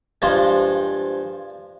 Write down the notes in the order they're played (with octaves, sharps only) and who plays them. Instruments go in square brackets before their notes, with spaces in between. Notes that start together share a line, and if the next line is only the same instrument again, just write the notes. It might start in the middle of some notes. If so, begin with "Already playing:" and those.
[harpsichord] G2 F3 G#3 C5